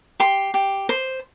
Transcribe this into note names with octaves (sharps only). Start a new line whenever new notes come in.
G4 C6
G4
C5